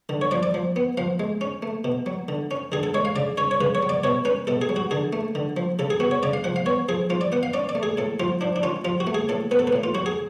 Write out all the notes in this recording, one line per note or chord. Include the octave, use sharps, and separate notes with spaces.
D3
C#5
F3 D5
D5
F3
B3
F3 F5
G#3
C#4
A3
B2
F#3
D3
C#4
D3 G#4
A4
G#3 C#5
F5
C#3 D5
C#4 C#5
C#5
C#3 B4
C#5
F#3
D5
B2 C#5
C#4 B4
B2 A4
G#4
F#3
F#4
D3 G#4
A3
D3
F3
C#3 A4
G#4
B3 F#4
C#5
C#3 D5
F5
F3 F#5
F5
B3 C#5
F3 G#4
F3 F4
D5
B3 F#5
F5
C#4 D5
D5
A3
G#4
A2 A4
F3 F4
F3 D4
D4
C#4 F4
F3 F4
F#4
A3
G#4
A2 A4
B3 B4
A4
B4
A2
F4
F#3 F#4
G#4